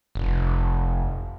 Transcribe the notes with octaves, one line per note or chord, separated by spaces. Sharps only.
F1